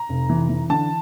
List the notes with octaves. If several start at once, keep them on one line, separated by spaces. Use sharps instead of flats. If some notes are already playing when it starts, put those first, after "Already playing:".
Already playing: A#5
F1
E3
E3
D3 A5